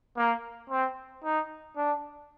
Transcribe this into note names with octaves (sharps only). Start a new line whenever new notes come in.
A#3
C4
D#4
D4